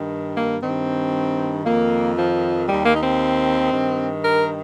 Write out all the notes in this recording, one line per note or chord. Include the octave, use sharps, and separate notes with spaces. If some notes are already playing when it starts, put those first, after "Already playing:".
Already playing: G2 D#3
A#3
G2 D#3 C4
F2 D#3 A#3
F3
D#2 D#3 G3
A#3
D#4
C4
G2 D#3
A#4